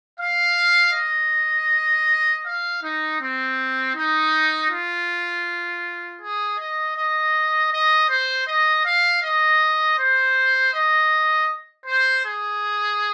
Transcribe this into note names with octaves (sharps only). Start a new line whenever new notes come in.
F5
D#5
F5
D#4
C4
D#4
F4
G#4
D#5
D#5
D#5
C5
D#5
F5
D#5
C5
D#5
C5
G#4